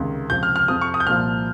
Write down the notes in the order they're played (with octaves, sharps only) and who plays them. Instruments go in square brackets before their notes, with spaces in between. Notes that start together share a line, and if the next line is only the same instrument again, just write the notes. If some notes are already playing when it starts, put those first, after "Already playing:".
Already playing: [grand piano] C#2 C3 D#3
C#2 C3 F3 G6
F6
F6
F2 C3 F3 D#6
C#6
D#6
G6
C2 A#2 F3 F6